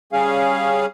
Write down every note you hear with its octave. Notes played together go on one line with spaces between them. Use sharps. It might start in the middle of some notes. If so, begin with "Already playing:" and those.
G3 C#4 G#4 F5